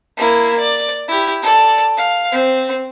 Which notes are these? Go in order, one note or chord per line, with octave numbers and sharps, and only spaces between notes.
A#3 E4
D5
E4 G4
A4 D5
F5
C4